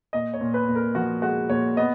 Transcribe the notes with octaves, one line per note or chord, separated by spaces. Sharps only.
A#2 D#5
C#5
A#2
B4
A#2
A#4
F3 F#4
G#3 F#4
A#2 C#5
B3 D#5